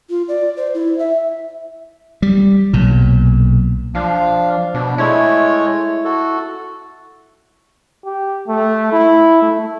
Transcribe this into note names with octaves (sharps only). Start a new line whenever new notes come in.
F4
D5
C5
E4
E5
G3
B1 A#2
F3 D4 F5
B2 D4
G#3 A3 E4 C#5
F#4 A4
G4
A3
E4
A3